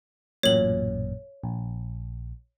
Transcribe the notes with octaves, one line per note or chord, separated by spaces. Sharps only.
A1 F#2 A#2 C#5 F#7
A#1